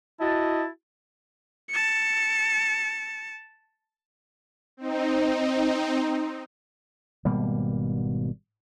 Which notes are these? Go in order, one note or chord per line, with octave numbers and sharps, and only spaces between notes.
E4 F#4 D#5 A5
A5 C#7
C4 D#4
G#1 B2 G3 A#3